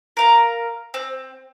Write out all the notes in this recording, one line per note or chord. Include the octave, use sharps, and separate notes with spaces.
A#4 F5 A#5
C4